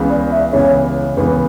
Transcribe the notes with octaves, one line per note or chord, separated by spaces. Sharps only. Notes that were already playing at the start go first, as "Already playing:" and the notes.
Already playing: C#2 C#3 E3 B3
D5
E5
C#2 C#3 E3 B3 C#5
C#2 C#3 E3 B3 B4